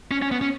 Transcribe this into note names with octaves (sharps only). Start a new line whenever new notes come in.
C#4
C#4
B3
C#4